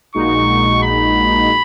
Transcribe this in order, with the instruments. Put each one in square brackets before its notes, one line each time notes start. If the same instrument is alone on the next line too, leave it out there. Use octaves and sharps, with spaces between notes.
[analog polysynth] A#1 A#2 G#3 D#4 F#4 [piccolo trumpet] C#6
[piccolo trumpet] B5